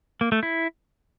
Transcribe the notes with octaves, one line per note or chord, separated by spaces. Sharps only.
A#3
A3
E4